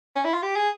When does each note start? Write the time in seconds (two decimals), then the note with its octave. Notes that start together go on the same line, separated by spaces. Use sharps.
0.16 C#4
0.24 E4
0.34 F4
0.43 G4
0.56 G#4